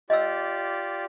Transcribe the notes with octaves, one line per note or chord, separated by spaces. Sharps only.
F4 G4 D5 D#5 E6